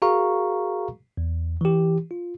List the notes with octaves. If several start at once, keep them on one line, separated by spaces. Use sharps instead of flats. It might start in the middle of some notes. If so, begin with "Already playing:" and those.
F#4 G#4 A#4 F5 A#5 C#6
E2
E3 G4
F4